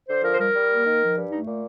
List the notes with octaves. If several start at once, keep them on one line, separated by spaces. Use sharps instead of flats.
D3 C5
F3 A#4
C5
G3 A#4
G3
A#3
D#3
F3
G2
A3 D#4
A#2